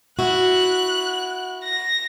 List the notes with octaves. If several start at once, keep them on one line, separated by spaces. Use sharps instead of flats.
E4 F#4 F#6
A#6